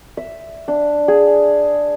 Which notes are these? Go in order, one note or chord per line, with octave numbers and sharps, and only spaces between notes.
E5
D4
G#4